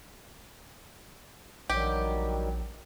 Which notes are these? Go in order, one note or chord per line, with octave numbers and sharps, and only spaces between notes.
A#1 D#3 F#3 G3 G4